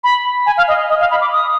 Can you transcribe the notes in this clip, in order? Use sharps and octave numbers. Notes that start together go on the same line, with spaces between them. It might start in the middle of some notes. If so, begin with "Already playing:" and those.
B5
G#5
F5
D#5
D#5
F5
B5
D6
D#6